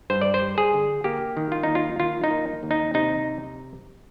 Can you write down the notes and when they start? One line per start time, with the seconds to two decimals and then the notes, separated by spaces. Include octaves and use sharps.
0.10 G2 C5
0.21 D5
0.34 C5
0.42 G3
0.58 G#4
0.74 D3
1.04 A#3 G4
1.37 D#3
1.52 F4
1.63 D#2 D#4
1.75 F4
2.00 D#3 F4
2.24 D#4
2.31 A#3
2.63 D#2
2.71 D#4
2.94 C3 D#4